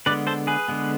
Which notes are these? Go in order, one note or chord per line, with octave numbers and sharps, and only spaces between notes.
D3 G#3 B3 B4 D5
A4 C5
G#4 B4
D3 G#3 B3